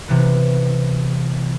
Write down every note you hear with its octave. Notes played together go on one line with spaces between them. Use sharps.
C3 E3 B3